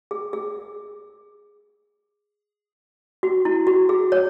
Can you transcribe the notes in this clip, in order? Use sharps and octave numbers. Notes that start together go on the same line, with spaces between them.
G#4
G#4
F#4
E4
F#4
G#4
C#5